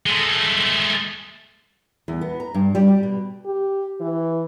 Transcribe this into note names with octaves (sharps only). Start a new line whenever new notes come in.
G#3 A3
E2
B3
A#5
G2
G3
G4
B2
G4
E3